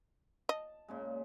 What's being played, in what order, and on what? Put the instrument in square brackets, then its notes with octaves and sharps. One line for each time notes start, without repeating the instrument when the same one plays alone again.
[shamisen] D#5 [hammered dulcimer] A5
[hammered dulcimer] A#2 C#3 G#3